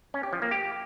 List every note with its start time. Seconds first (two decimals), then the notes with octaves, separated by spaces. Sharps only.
0.14 C#4
0.23 G4
0.33 F3
0.42 A#3
0.51 G4